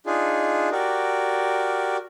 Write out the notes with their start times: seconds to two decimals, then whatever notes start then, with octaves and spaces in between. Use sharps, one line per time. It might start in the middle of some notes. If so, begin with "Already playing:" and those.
0.06 D4 D#4 F4 G#4
0.72 F#4 G4 A#4 D5